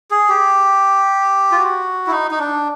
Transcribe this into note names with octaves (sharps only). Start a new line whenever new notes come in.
G#4
G4
F4
F#4
E4
D#4
D#4
D4